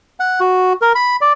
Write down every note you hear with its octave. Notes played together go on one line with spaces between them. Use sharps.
F#5
F#4
A#4
B5
D5